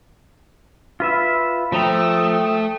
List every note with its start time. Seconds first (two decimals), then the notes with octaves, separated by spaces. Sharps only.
1.00 F4 B4 E5
1.72 F3 A3 G5 A#5 D#6